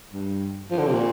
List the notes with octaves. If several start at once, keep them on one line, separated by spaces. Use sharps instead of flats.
G2
F3
D3
C3
A#2